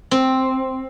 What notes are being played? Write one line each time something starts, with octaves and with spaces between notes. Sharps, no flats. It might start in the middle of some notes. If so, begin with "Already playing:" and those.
C4